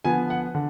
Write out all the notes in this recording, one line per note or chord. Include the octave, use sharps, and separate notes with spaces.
D3 F3 B3 G#5
F#5
D3